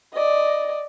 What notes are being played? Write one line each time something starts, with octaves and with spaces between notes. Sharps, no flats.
D5 D#5